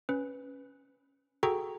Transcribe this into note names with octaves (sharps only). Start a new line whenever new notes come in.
C#4 B4
F#4 G#4 A4 G5 A#5 C#6